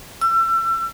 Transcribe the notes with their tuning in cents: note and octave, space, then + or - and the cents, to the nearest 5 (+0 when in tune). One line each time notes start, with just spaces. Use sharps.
E6 +35